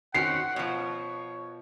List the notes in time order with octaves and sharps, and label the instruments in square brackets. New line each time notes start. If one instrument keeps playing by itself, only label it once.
[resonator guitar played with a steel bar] D#3 C4 C#4 [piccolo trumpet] F#5 [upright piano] C7
[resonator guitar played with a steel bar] B2 F3 [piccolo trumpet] C#5